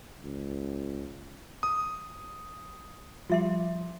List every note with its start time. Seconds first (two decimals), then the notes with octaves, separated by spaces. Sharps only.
0.23 C#2
1.63 D#6
3.30 F3 G3 F4 E5 C6